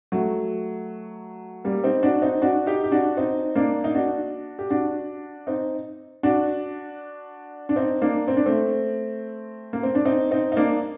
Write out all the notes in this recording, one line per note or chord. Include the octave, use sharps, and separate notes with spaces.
F#3 A3
G3 A#3
C4 D#4
D4 F#4
C4 D#4
D4 F#4
D#4 G4
G4
D4 F#4
C4 D#4
A#3 D4
D#4
D4 F#4
G4
D4 F#4
C4 D#4
D4 F#4
D4
C4 D#4
A#3 D4
C4
D4
A3 C4
A#3
C4
D4
C4 D#4
C4 D#4
D#4
A#3 D4